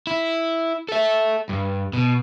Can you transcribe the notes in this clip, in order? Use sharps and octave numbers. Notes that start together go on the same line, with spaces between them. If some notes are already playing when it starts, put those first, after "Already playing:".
E4
A4 E5
G2
B2